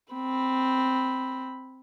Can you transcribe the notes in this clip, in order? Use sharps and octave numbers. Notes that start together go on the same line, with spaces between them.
C4 B5